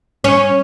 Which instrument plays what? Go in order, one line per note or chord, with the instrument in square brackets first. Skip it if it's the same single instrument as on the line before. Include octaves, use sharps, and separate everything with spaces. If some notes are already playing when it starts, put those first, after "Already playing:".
[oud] C#4